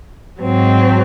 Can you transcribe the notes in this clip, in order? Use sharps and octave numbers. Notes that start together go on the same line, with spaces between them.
G#2 F#3 C4